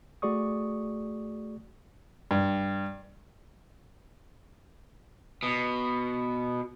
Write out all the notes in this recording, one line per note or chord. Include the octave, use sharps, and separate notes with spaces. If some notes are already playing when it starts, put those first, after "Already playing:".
A3 F#4 G#4 D5 C#6 D#6
G2
B2